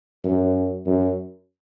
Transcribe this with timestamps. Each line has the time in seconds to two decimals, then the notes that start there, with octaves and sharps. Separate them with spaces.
0.24 F#2
0.86 F#2